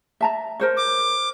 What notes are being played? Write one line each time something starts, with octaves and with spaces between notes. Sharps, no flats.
E5 A5 A#5
A#4 C5 C#5
D6